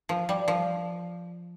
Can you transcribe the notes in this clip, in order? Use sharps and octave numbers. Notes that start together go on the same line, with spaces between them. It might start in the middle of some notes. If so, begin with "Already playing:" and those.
F3
G3
F3